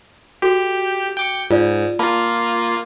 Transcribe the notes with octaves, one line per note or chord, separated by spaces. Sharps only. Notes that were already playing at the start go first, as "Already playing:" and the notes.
F#4 G4 A4
G5 D6 C#7
G#2 F4 D5
A#3 F4 F5 A5 B5